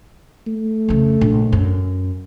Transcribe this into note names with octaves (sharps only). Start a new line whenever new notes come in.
A3
F2 C#3
A#1
F#2